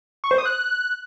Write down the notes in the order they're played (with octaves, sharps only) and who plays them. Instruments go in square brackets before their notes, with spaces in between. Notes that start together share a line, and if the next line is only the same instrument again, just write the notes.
[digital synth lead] C#6
C5
D#6
F#6